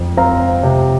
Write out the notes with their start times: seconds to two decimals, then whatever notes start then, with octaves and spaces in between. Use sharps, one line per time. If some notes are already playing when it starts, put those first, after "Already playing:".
Already playing: F2
0.17 C4 F5 A#5
0.63 C3